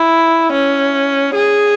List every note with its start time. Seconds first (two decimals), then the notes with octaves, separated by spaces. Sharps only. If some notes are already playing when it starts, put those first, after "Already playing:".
Already playing: E4
0.53 C#4
1.35 G#4